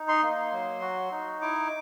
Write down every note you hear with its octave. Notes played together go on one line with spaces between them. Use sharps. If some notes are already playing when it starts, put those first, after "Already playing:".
Already playing: D#4
C6
A#3
F#3
F#4
D#4
E4 D6